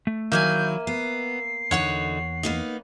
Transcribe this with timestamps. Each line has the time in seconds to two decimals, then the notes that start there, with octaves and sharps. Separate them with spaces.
0.07 A3
0.32 D#3 F#3 A#3 E4 E5 G#5 G6
0.87 B3 C7
1.71 E2 D3 D#4 F#4 C#5 F#5
2.43 A#3 B3 D#4